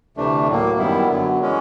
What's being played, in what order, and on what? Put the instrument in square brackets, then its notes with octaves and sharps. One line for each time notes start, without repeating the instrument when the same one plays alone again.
[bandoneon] D2 C3 E3 A3 D4
A2 F#3 A#3
F#2 D#3 G3 B3 E4
F#2 D3 F#3 B3
E3 G#3 C#4